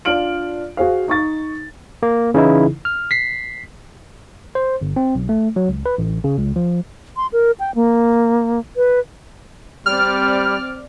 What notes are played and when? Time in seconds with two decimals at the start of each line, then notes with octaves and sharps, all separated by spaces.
0.05 D4 F4 F6 D7 F#7
0.77 F#4 G#4 C5 F5
1.08 D#4 C#6 A6
2.03 A#3
2.34 C#3 E3 D#4 E4
2.85 F6
3.11 B6 C7
4.55 C5
4.81 G1
4.96 C4
5.15 B1
5.29 A3
5.56 F#3
5.69 C#2
5.86 B4
5.98 A1
6.24 C#3
6.39 C#2
6.56 F3
7.17 C6
7.33 A#4
7.60 G5
7.75 A#3
8.77 B4
9.86 G3 C4 D5 F6